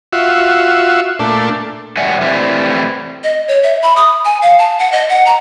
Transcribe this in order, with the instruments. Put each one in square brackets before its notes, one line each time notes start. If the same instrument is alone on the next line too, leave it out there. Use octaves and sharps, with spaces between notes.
[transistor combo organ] F4 F#4 E5
A#2 A3 D4
[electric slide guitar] E2 F#3 G3 E5 F#5 G#5
E3 G3 A3 C4 E4
[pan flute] D#5
C#5
E5
B5
D#6
G#5
F5
A5
F#5
D#5
F#5
A#5